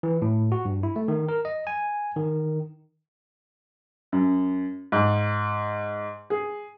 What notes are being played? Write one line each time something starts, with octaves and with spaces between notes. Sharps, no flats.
E3
A2
F#4
G2
E4
A3
D#3
A#4
D#5
G#5
D#3
F#2
G#2
G#4